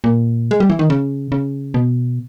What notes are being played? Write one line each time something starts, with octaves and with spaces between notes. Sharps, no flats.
A#2
G#3
G3
E3
D#3
C#3
C#3
B2